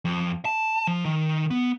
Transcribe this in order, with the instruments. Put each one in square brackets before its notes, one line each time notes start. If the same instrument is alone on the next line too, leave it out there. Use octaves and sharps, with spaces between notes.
[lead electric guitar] F2
A5
F3
D#3
B3